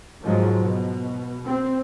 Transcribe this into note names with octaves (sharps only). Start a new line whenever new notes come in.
D#2 G#2 F3 F#3 G#3
B2
C4